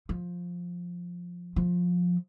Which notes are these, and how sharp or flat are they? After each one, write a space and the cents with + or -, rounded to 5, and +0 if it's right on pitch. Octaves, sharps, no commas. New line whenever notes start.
F3 +10
F3 +20